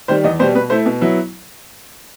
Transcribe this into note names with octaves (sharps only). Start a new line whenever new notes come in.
D#3 G3 C5
E2 D#5
B2 G3 C5
B2 B4
A3 E4 C5
B2
F#3 B3 E4